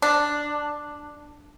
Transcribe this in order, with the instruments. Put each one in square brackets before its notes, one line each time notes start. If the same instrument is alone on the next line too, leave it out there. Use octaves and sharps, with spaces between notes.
[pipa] D4